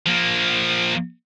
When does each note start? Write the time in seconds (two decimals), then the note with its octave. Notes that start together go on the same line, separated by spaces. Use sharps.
0.06 F3 A#3